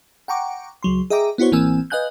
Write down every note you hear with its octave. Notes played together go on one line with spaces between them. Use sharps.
F#5 G5 A#5 C#6 D6
C#2 F#3 C6
G#4 D#5 E5 G5 A#5 D6
B3 E4 F#4 C5 C#5
A1 E3 A#3 C4 G#5 E6
B4 D#5 F5 G#5 F#6 G6